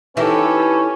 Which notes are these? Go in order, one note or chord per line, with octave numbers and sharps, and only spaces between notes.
E3 C#4 D#4 E4 G4 A4 B4